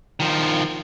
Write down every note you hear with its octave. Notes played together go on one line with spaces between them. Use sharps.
D#3 F3